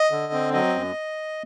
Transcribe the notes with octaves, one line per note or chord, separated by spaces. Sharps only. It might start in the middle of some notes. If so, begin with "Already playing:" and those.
Already playing: D#5
D3
C4
F#3 D#5
F#2